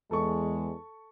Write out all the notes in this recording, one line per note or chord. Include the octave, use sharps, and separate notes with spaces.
E2 G#3 A4 C#6